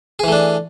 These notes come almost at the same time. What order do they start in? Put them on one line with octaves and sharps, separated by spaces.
G#4 E3 A3 D4